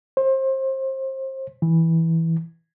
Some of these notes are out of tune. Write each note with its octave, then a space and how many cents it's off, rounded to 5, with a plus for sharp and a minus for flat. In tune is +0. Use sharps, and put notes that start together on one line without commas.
C5 +30
E3 -10